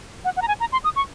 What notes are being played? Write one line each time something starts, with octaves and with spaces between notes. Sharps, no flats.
F#5
F#5
A#5
G#5
A#5
C6
D#6
C#6